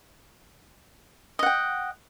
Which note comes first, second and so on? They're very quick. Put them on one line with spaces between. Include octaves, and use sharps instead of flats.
D#5 F#5 G5